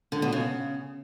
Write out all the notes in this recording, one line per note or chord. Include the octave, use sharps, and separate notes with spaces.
D3
B2
C#3